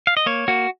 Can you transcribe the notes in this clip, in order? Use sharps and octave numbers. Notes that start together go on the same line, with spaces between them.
F5
D#5
A#3 C#5
A#3 F#4